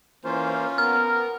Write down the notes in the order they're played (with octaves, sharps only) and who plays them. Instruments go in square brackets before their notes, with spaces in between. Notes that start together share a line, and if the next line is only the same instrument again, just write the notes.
[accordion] E3 C5 [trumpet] A#3 [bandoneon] C#4 F4
[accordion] B3 [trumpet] A#4 [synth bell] F6